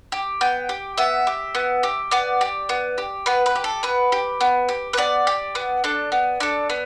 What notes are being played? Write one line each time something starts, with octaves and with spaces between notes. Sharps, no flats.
G4
B3 G5
G4
B3 E5
G4
B3
G4
B3 D5
G4
B3
G4
B3 B4
B4
G4
A4
B3 B4
G4
B3
G4
B4
B3 D5
G4
B3
D4 A4
B3
D4 A4
B3